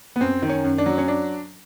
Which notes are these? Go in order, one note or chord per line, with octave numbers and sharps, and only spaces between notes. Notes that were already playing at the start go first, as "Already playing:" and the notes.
B3
F#2 C4
D#3
C#4
F#2
D4
F#3
C#4
D4